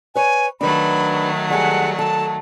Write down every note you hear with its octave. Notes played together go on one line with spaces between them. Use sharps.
B4 C#5 G#5
D#3 F#3 A3 D4 B4 B5
G3 G#4 A4 F#5
A4 A5